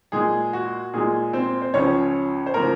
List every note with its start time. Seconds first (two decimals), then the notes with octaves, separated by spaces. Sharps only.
0.12 A#2 G#3 G#4
0.53 F#4
0.93 A#2 G#3 G#4
1.33 C4 C5
1.62 C5
1.74 C#2 C#3 F3 C#4 C#5
2.46 C5
2.54 C#3 F3 A#3 A#4